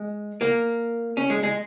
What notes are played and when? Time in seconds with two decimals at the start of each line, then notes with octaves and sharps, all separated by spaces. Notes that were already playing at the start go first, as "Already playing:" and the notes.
Already playing: G#3
0.41 A#3
1.17 C#4
1.30 G#3
1.43 G#3